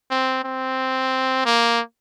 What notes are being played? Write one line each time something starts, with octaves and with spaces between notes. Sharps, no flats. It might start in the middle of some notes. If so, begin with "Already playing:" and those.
C4
C4
A#3